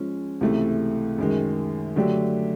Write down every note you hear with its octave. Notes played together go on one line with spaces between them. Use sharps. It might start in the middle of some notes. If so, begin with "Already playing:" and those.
Already playing: F3 G#3 C#4
C#2 C3 E3 A3
F#2 D#3 G#3
D3 F#3 A3 D4 G4